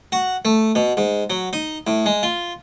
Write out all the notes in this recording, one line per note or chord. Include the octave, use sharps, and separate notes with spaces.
F#4
A3
B2
G#2
F#3
D#4
A2
G#3
F4